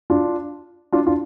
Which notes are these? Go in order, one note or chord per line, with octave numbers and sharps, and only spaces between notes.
D4 F4
D4 F4
D4 F4